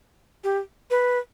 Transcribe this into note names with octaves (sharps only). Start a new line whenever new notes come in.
G4
B4